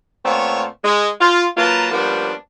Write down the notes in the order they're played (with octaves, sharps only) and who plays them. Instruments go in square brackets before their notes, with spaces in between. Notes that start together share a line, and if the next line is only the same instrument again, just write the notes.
[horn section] A#2 A3 B3 C4 C#5 F5
G#3
F4
F#3 A#3 F4 B4 A5 A#5
F3 G3 A#3 B3 C#4 D4